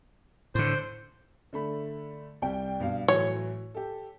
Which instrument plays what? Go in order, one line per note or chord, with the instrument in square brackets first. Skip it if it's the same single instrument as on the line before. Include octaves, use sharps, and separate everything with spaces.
[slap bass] A2 D3 [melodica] C5
[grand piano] D3 A3 B5
C2 G3 G5
G2 B2 F5
[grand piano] A2 E3 F#3 [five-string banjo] C#5
[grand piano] G4 A4